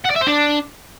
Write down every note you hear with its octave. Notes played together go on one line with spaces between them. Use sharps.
F#5
D5
E5
C5
D4